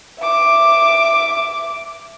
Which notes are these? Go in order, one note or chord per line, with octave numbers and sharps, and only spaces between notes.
E5 D6